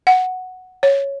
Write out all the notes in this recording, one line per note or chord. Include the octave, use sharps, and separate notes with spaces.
F#5
C#5